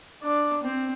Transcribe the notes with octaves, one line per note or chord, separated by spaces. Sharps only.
D4
C4